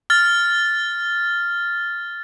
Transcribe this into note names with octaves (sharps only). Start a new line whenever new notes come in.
F6 A6